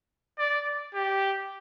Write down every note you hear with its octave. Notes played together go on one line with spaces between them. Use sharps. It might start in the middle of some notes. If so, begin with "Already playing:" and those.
D5
G4